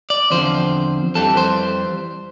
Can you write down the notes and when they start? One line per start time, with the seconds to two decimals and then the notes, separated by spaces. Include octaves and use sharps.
0.10 D5
0.31 E2 D3 F3 C4 C5
1.15 F2 E3 G3 C4 A4
1.37 C5